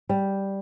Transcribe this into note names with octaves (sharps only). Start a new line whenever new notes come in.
G3